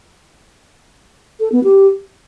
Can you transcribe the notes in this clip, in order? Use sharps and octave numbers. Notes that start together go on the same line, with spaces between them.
A4
B3
G4